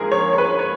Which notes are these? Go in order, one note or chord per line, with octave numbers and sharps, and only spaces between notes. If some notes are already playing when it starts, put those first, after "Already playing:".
Already playing: A#1 G#2 F3 A#3 G#4 A#4
C#5
C#5
B4
C#5